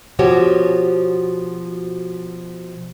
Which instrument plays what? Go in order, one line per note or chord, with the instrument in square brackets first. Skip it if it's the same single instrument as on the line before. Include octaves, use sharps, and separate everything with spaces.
[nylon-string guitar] B2 F3 F#4 G4 C#5